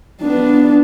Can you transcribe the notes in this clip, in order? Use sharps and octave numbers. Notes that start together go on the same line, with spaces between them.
B3 D4